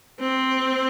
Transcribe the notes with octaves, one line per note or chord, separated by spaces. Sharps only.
C4